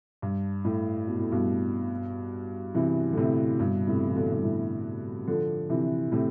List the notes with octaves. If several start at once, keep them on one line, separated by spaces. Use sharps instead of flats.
G2
A2
B2
A2
G2 B2
C3 E3
D3
A2 C3
G2 B2
A2 C3
E3
B2 D3
G2
A2
D3 F3
C3 E3
A2 C3